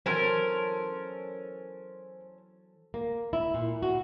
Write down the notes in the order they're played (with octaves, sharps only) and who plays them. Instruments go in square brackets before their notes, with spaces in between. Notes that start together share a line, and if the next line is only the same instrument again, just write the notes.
[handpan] E3 F#3 [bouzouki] C#4 A#4 [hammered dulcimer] A4 A5 C6 [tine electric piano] C5
[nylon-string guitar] A#3
E4
A#2
F#4